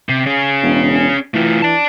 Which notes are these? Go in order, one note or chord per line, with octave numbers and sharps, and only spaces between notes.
C3
C#4 G#4
E1
E3 A3 F4
D5 A5